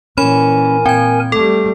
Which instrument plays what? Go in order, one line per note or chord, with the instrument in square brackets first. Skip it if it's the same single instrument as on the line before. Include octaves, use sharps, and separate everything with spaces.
[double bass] A#2 E3 [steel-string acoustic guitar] C#4 [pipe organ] A#4 G#5 [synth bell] B5
[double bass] A#2 [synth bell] C4 G#6 [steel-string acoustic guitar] G5
[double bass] G3 A3 [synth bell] A4